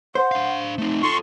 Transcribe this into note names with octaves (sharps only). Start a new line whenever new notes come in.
C5 F#5
D4 F5
A3 C4 D#4
F4 A4 C6 C#6